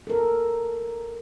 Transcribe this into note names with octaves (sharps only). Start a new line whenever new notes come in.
A4 A#4